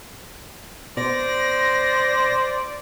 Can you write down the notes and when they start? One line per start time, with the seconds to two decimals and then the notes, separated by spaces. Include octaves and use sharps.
0.97 B2 C5 D5 A#6